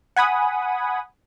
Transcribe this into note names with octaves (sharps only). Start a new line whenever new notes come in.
F#5 G#5 B5 D#6